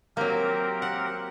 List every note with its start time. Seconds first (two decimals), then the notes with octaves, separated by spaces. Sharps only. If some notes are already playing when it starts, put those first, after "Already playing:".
0.17 F#3 A#3 C4 G4 A#4
0.82 F#5